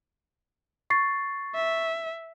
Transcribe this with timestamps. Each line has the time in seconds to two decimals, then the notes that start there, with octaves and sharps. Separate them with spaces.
0.90 C#6 A6 C7
1.55 E5